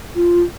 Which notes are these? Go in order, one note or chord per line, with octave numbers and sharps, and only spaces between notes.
F4